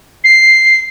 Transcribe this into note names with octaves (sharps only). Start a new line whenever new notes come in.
C7